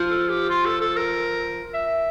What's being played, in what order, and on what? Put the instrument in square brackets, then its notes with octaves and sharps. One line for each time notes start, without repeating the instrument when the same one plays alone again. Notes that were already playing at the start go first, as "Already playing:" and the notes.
Already playing: [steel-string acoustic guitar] F3
[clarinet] A4
G4
F4
A4
A4
A#4
E5